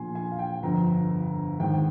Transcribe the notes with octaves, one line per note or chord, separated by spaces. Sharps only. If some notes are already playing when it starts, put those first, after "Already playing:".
Already playing: A#1 A#2 G#5 C6
G#5
F5
G5
G1 F2 D3 A#5
G#1 G#2 D#3 G5